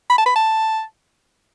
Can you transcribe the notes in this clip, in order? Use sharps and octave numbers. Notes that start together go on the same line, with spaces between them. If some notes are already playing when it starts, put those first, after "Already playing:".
B5
A5
B5
A5